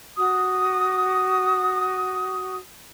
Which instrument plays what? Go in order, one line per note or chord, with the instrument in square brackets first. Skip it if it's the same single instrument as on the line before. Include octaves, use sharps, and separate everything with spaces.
[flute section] F#4 D#6